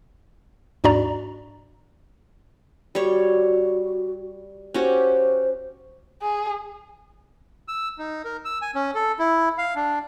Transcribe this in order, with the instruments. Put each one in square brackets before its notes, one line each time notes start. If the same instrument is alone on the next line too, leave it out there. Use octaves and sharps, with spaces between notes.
[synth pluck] D#2 G#2 D4 F#4 D5 A#5
[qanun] G3 C#5 [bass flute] F#4
[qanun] C#4 F#4 G4 [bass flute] C5
[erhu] G#4
[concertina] E6
D#4
A#4
E6
G#5
C#4
A4
E4
F5
D4